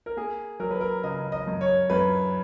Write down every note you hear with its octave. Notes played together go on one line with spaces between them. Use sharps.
A#4
A#3 G#4
F#3 A#4
B4
A#4
C#3 D#5
D#5
F#2
C#5
F#2 B4